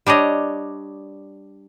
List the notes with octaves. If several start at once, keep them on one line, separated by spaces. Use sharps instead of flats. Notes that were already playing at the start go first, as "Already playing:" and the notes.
G3 D4 C#5 D#5